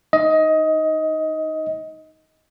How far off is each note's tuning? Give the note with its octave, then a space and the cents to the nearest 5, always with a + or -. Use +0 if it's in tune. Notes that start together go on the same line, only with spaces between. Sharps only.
D#4 +0 D#5 +20